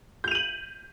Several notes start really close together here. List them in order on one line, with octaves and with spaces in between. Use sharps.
G6 F7 D#7 F#7